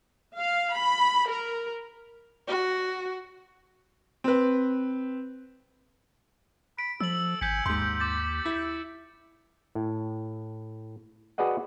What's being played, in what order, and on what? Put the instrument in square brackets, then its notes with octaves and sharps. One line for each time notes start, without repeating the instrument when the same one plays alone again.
[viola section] F5
B5
A#4
[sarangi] F#4
[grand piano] C4 B4
[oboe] B5 [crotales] D7
[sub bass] F3 [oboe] A4 [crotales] E6 F#7
[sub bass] G#1 [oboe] G#5 [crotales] G6 B6 C#7
[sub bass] D#2 [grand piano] G#2 C6 [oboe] G4
[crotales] D6 A6
[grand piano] E4
[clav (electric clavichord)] A2
F#4 G#4 B4 D5 D#5 F#5